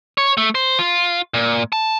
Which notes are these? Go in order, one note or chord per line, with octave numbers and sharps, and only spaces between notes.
C#5
A3
C5
F4
A#2
A5